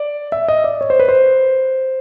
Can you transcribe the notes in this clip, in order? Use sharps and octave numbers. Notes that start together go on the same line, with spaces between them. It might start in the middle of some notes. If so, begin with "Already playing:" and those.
Already playing: D5
E5
D#5
D5
C#5
C5
B4
C5